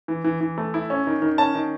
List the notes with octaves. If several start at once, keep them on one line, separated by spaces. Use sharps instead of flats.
E3
E3
E3
A3
E4
C#4
D#3
D#3
C#4 A5
D#3